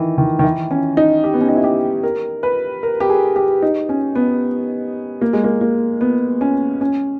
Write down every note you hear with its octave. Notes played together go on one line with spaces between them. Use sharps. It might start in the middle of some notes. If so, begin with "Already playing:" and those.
Already playing: D#3 E3
D#3
D#3
E3
C#4
D#4
G4
B3
C#4
D#4
E4
G4
A#4
B4
A#4
G4
G#4
G4
D#4
C#4
B3
A#3
G#3
A#3
A#3
B3
C#4
C#4